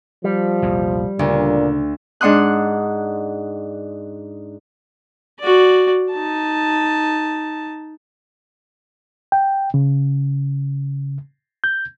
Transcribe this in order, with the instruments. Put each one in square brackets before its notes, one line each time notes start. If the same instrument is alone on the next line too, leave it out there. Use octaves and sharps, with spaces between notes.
[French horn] F3 [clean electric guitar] G3
[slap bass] A#1 E2 C3
[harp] D2 [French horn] A#2 [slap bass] C#3
[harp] G#2 D4 F#5 C6 D#6 F#6
[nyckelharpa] F#4 D5
D#4 A5
[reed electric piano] G5
C#3
G6